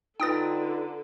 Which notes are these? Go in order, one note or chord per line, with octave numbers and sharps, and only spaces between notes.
D3 D#4 F4 A4 B4 G5 D#6 A6